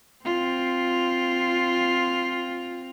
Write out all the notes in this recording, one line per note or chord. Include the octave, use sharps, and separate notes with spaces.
C4 F4